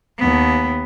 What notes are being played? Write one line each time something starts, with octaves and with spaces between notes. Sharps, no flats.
D#2 B3